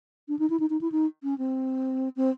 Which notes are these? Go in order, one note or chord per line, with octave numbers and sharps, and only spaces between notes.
D4
D#4
E4
D#4
D#4
E4
D#4
C#4
C4
C4